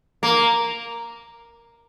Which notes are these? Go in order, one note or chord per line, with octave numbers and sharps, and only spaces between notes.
A#3